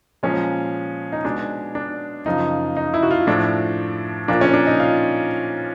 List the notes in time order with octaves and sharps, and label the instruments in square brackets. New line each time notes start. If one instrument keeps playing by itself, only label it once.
[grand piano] A#2 F3 G#3 C#4
D#4
B2 G#3 D4
D4
F#2 C#3 F3 D#4
D#4
E4
F#4
F4
A2 F3 A3 D4
A#2 F3 A#3 D4
C#4
D4
D#4
F4